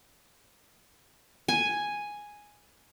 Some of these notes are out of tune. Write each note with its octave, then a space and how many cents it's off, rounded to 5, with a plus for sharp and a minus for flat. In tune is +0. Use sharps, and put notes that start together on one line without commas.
G#5 +0